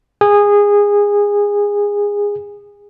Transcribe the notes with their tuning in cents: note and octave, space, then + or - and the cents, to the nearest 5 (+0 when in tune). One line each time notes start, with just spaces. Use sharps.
G#4 -20